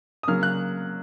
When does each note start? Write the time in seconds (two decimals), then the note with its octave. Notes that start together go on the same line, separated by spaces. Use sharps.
0.23 D#6
0.28 C#3 F#3 A#3 F6
0.43 F#6